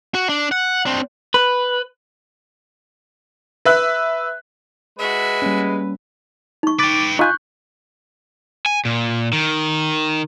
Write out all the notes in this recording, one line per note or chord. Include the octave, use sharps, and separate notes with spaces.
F#4
D4
F#5
C4 D4
B4
B4 E5 F#6
G#3 F#4 B4 E5
G3 A#3 C#4
D#4 C#6
B4 G5 D6 A6
D#4 F4 G#5 C#6 F#6 G6
G#5
A#2
D#3